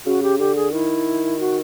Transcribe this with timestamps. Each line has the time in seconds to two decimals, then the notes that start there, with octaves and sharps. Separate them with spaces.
0.06 C#3 F#4
0.23 G4
0.39 D3 G4
0.56 G#4
0.73 D#3 E4
1.39 F#4